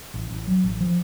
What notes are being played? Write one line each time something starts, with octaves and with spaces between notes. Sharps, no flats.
A1
A1
F#3
A1
F3